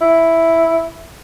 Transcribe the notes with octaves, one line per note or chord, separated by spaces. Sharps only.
E4